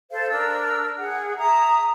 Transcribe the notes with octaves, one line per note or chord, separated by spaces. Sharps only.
A4 C5 F5
D4 A#4 E6
G#4 F#5
E5 A#5 D#6